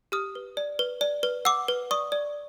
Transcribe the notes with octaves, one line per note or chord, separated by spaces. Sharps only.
G4 D#6 F6
B4
D5
B4
D5
B4
F#5 D6 E6
B4
D5 C#6 D#6
D5